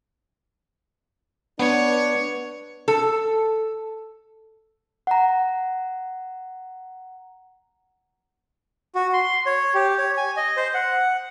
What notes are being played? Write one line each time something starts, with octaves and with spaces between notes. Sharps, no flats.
B3 D4 B4 C#5
A4
F#5 A#5
F#4
C6
C#5
G4
C#5
G#5
D#5
C5
F#5